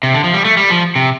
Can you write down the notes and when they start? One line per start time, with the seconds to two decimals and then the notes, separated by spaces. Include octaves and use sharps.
0.03 C3
0.14 D3
0.24 F3
0.34 G3
0.45 A3
0.57 G3
0.70 F3
0.96 C3